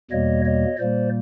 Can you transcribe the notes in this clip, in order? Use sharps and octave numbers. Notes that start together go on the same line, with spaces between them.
E2 B2 G3 A#3 C#5 D#5
C#5 D#5
A#2 G3 A#3 C5 D5